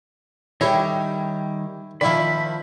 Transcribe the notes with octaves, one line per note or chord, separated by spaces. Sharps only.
D#3 G3 E4 G4 G#4 C#5
D#3 F3 A#3 E4 D5 B5